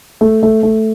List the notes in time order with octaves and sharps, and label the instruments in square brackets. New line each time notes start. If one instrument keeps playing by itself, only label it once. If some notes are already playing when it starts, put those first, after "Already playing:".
[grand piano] A3
A3
A3